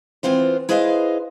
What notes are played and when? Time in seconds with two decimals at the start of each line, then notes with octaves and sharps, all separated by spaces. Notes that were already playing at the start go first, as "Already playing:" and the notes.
0.23 E3 B3 C4 F4 C5
0.69 E4 G#4 B4 C5 D#5 F5